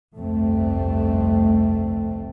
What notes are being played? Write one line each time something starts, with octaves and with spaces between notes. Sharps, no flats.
G1 C2 F2 A3 C4